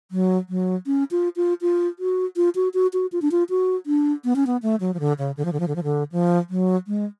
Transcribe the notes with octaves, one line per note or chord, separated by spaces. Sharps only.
F#3
F#3
C#4
F4
F4
F4
F#4
F4
F#4
F#4
F#4
F4
D4
F4
F#4
D4
B3
C#4
B3
A3
F#3
F3
D3
C#3
D3
F3
D3
F3
D3
F3
D3
F3
F#3
G#3